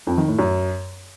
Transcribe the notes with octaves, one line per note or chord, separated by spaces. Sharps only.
F2
D#3
A2
F#2